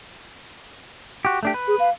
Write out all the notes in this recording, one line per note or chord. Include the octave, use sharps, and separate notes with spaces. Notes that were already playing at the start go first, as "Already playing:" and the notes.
F#4 G4
A3 D4 G4
B4
G#4
F5